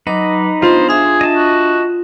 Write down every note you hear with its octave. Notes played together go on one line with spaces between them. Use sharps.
F#3 D#4 B4 D#5 D6
B3 D4 F4 C5 D#5
D4 G#4 E5
D#5 A5
F#4